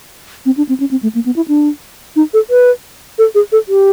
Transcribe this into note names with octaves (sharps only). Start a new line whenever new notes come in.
C4
D4
C4
C#4
C4
A3
A#3
B3
E4
D4
D#4
A4
B4
A4
G#4
A4
G4